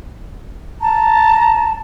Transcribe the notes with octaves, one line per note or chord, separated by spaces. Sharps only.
A5 A#5